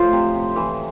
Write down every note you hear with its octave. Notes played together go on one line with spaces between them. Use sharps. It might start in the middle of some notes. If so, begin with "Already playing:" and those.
Already playing: A2 F3 C5
C3
C3
E3